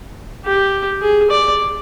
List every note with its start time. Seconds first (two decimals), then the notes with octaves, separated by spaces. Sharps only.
0.45 G4
1.01 G#4
1.30 D5